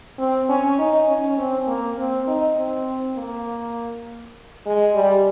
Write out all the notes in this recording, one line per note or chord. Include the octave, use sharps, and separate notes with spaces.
C4
C#4
D#4
C#4
C4
A#3
C4
D#4
C4
A#3
G#3
G3